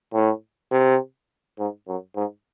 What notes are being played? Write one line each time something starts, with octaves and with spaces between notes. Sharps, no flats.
A2
C3
G#2
F#2
G#2